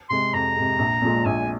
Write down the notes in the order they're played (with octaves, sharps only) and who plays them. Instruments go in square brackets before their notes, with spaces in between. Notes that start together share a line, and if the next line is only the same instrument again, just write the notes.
[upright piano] C3 G#3 [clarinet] C6
[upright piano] F2 [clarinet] A#5
[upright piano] C3 G#3
A#1
A#2 F3 G#3
[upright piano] A#1 [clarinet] G#5